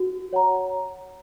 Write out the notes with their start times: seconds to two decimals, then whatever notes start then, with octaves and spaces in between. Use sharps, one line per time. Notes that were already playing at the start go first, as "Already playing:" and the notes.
Already playing: F#4
0.33 C#5 F#5 A#5